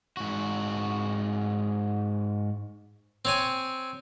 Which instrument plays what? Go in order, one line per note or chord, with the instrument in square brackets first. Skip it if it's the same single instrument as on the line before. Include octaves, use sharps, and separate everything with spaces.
[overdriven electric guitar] G#2 F#4
[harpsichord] C4 C#5 G#5